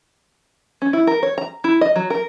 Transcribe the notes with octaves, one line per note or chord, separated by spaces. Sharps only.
C#4
E4
A#4
C#5
A#5
E4
D#5
F#3
A#4